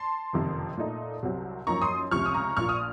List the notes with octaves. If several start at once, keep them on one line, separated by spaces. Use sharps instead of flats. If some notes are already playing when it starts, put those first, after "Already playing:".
Already playing: A5 C6
F#1 F2 C3 D#3
A#2 A3 D#4
C2 C3 F#3 C4
F#2 F3 A#3 D#4 A#5 C#6
C6 D#6
C#2 C3 F3 C#6 F6
D#6
A#5 C#6
A#1 A#2 F3 C#6 F6
D#6